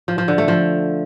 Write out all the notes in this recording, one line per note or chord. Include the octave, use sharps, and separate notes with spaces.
F3
F3
D3
A3
F3